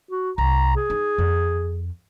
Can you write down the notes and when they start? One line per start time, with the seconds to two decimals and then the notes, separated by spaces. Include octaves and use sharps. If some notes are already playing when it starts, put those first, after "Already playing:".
0.11 F#4
0.38 C2 A#5
0.76 G#4
0.90 D#4
1.18 F2